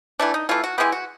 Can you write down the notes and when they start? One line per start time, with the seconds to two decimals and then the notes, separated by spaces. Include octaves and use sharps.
0.20 E3 A3 D4
0.34 D#4
0.49 E3 A3 F4
0.64 F#4
0.78 E3 G#3 B3 G4
0.92 F#4